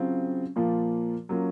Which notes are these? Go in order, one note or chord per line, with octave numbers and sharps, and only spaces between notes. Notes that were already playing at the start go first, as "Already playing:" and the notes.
Already playing: C#3 F#3 C4 F4
A#2 F3 A#3 F4
F#3 A#3 C#4 F4